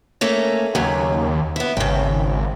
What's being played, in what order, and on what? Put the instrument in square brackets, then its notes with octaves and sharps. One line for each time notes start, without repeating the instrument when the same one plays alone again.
[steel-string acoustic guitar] A3 A#3 C#4
[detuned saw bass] D#2 [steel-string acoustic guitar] C#3 F#3 A#3
[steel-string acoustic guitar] B3 E4
[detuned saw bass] G#1 [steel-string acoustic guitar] C#3 G5